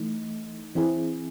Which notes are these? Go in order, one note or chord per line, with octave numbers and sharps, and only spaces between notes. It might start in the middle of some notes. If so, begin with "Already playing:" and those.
Already playing: E3 A3 D#4
E3 C4 E4 G#4